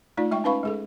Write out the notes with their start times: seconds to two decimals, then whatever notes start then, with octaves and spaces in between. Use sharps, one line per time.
0.17 A3 D#4 F4 D5
0.31 G#3 E5 G5 C#6
0.44 C#4 D#4 B4 F5 B5 C#6
0.63 G#3 G#4 A4